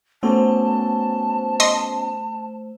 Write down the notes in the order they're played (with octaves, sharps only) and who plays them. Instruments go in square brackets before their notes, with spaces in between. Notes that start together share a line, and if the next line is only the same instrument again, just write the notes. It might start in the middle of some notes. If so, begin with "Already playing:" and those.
[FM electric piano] A3 C5 [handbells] B3 C#4 F#4 [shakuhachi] A5
[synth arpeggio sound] D#5 C6